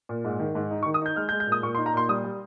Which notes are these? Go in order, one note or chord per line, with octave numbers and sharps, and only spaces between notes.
A#2
G#2
D#3
G#2
D#4
C#6
D#3
D#6
D#4 G6
G#3 F6
G6
G#3
G6
A#2 D#6
A#2 C#6
C6
D#4
A#5
A#2 C6
G3 D#6
G3